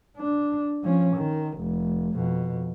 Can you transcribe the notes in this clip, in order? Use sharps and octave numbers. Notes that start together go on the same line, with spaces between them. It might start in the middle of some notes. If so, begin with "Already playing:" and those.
D4
F3 C#4
D#3
F1
F2 B2